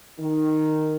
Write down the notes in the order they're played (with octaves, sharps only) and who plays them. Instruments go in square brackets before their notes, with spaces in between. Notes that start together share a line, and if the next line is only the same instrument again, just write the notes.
[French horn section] D#3